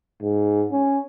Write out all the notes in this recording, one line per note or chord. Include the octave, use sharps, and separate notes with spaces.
G#2
C#4